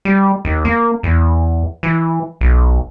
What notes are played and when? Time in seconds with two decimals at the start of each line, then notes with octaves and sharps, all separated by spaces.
0.05 G3
0.45 D#2
0.65 A#3
1.03 E2
1.83 E3
2.41 B1